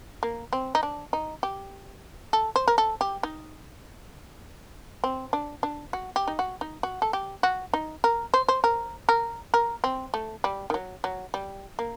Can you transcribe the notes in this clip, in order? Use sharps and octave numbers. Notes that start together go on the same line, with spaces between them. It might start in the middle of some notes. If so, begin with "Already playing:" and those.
A#3
C4
D#4
D4
D#4
G4
A4
C5
A#4
A4
G4
D#4
C4
D4
D4
F#4
G4
D#4
F#4
D#4
F#4
A4
G4
F#4
D#4
A#4
C5
C5
A#4
A#4
A#4
C4
A3
G3
D#3
F#3
F#3
G3
A#3